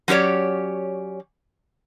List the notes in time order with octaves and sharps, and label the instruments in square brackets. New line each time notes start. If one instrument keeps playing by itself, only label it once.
[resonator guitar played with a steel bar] F#3 C#4 G4 C#5 D5